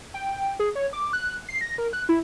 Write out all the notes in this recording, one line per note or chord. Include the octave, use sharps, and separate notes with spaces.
G5
G#4
C#5
D6
F#6
C7
A#6
A#4
F#6
E4